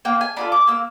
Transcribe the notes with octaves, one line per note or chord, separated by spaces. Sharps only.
A#3 G5
G#5
D4 F4 A4 B5
D6
A#3 E6